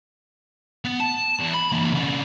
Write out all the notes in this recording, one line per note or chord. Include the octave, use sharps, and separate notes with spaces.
B3
A5
E2
B5
E3 A#3
C#3 D4